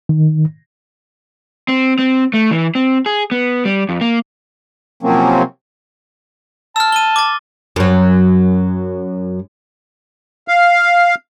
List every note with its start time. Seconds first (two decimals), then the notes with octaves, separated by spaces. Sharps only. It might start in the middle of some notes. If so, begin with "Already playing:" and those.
0.09 D#3
1.68 C4
1.99 C4
2.34 A3
2.51 E3
2.75 C4
3.06 G#4
3.31 B3
3.65 G3
3.89 F2
4.01 A#3
5.03 C3 F3 F#3 A#3 C4 C#4
6.76 A5 E6 F6
6.92 D#7 G7
7.16 D6 A6
7.76 F#2 F#3
10.48 F5